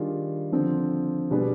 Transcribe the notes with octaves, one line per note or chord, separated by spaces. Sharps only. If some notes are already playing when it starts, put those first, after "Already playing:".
Already playing: D#3 G3 D4 F4 G#4
D3 F3 C4
B2 G3 D4 G#4 B4